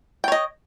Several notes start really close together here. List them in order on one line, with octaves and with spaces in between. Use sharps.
G5 C#5 D#5